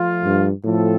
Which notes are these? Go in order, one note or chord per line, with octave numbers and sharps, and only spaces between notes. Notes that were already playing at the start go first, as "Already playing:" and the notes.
Already playing: F3 A3 F4
G2
A2 F3 C4 F4 A4